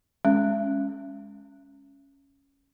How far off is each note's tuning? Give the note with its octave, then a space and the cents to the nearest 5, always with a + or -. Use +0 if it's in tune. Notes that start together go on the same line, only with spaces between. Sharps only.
G#3 +0 C#4 +0